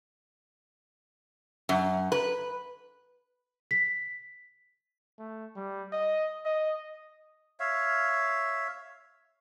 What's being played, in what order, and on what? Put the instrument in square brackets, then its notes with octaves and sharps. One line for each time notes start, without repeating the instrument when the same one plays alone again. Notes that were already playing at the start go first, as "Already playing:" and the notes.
[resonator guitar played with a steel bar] F#2
B4
[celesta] B6
[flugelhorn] A3
G3
D#5
D#5
[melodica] C#5 E5 F5